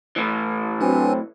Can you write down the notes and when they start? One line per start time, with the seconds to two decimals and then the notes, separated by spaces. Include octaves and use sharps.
0.16 A2 E3
0.81 F#3 C4 D4 B4 G#5